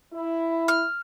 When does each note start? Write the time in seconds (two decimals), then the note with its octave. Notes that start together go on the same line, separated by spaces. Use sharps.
0.14 E4
0.68 F6